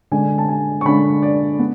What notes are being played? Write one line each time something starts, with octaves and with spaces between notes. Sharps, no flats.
D3 G#3 D4 G#5
A5
G#5
C#6
D3 G#3 D4 B5
D5
B3